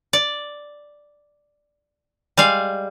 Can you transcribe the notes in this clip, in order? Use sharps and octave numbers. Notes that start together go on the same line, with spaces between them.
D5
G3 G#3 F5